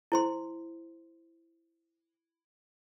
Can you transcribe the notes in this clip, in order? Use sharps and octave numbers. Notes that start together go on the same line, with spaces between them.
E4 C5 C6